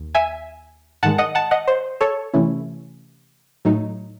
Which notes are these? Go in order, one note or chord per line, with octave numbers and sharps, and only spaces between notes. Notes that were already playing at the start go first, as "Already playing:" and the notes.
Already playing: D#2
E5 G#5
G#2 D#3 G#3 F#5 A5
D#5 F#5
F#5 A5
D#5 F#5
C5
A4 C#5
C3 E3 A3 C#4 E4
A2 F#3 A3 D#4